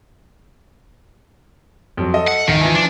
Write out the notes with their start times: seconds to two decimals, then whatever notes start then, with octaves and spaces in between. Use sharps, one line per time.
1.97 F2 F#3
2.14 A4 D#5
2.27 F#5
2.48 D1 D#3
2.61 E3 F3
2.75 D4